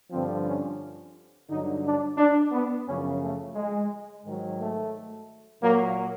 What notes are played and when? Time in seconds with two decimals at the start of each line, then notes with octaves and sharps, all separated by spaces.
0.11 G2 D3 F3 C4
0.45 C#4
1.48 G2 D3 F#3 D#4
1.84 D4
2.18 D4
2.52 B3
2.87 F#2 C#3 F3 C#4
3.21 A3
3.56 G#3
4.25 G#2 D#3 F#3
4.59 A3
5.62 A#2 F#3 A#3